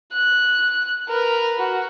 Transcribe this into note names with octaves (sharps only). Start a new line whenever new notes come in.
F#6
A#4 B4
F#4